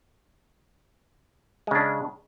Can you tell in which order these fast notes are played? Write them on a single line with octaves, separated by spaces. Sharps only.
G#3 C#3 D4